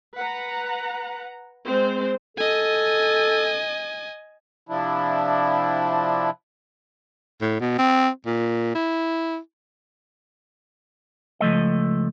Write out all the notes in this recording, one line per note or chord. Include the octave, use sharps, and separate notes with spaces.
B4 F#5 A#5
G#3 C4 C5
A4 D#5 G#5
C3 F3 D4 E4
A2
B2
C4
A#2
E4
C#2 F3 A3 D#5